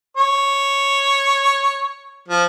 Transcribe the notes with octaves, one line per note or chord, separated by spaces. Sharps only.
C#5
F3